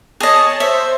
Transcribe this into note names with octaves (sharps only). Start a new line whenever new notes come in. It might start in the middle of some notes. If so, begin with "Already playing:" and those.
G#4 C#5 D#5 A5
C5 E5